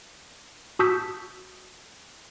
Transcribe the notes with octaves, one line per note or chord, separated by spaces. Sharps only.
F#4 A5 D#6 E6 G6 B6